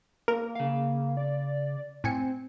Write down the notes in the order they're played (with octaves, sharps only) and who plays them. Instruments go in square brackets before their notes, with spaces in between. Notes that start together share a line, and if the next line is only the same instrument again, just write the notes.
[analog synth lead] A#3 [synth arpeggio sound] A#4
[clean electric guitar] C#3 F5
[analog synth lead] D5
[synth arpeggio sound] A2 G#5 C#7 [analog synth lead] C4